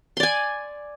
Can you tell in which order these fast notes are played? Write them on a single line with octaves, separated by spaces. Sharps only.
C6 D5 G#5